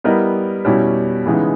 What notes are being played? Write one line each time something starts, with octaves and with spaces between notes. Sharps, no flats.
G3 B3 E4 A#4 D#5
B2 G3 C#4 E4 G4
C#3 E3 G#3 B3 D#4